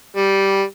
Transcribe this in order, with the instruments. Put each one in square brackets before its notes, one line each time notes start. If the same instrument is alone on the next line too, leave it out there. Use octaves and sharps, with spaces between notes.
[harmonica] G3